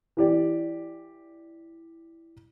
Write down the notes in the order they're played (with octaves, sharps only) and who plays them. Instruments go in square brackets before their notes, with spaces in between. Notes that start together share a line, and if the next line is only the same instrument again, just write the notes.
[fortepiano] E3 G4 D5